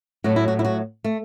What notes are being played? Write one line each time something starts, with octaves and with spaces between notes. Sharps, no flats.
A2 F#3 A3 F#4
E4
F#4
E4
F#4
A3